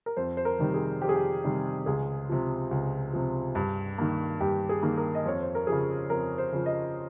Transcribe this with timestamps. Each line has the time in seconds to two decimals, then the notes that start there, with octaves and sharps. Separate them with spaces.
0.06 A#4
0.17 F2 C5
0.37 C5
0.45 A#4
0.59 C3 D#3 G3
0.74 G#4
1.02 F2 G4
1.09 G#4
1.16 G4
1.44 C3 D#3 G3
1.86 C#2 G#4
2.29 C3 F3
2.71 C#2
3.13 C3 F3
3.55 G2
3.98 D#3 A#3
4.40 G2 G4
4.69 G#4
4.83 D#3 A#3
4.97 A#4
5.15 D#5
5.26 F2 C#5
5.41 C5
5.55 A#4
5.67 C#3 F3 G#4
6.10 F2 A#4
6.38 C5
6.53 C#3 F3
6.66 D#5